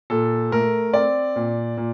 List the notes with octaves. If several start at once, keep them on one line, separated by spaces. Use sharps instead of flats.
A#2 A4
A3 A#4
C4 D5
A#2
A#2